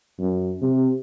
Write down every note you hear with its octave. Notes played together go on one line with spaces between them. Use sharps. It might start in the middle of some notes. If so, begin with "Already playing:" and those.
F#2
C3